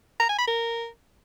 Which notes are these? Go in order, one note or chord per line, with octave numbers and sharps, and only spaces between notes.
A#5
G#5
B5
A#4